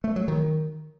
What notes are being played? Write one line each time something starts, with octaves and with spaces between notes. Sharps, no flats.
A3
F#3
D#3